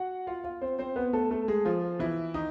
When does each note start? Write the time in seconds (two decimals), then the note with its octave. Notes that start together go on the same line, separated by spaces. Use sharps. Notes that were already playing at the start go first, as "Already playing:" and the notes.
Already playing: F#4 F#5
0.27 F4 F5
0.44 F4 F5
0.61 C4 C5
0.79 C4 C5
0.96 B3 B4
1.13 A3 A4
1.31 A3 A4
1.48 G#3 G#4
1.65 F3 F4
1.99 E3 E4
2.34 D#3 D#4